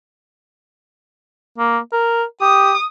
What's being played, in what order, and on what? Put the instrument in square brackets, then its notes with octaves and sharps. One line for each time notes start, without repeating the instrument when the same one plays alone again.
[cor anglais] A#3
A#4
[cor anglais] G4 [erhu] D#6